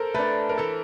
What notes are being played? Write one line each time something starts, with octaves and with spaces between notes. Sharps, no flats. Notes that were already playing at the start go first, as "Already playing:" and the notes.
Already playing: A4 A#4 C5
A3 D4 B4
A#4
E3 A4